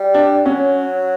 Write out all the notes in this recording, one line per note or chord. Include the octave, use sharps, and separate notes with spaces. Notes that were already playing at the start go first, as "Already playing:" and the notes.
Already playing: G3
D4
F#3 C#4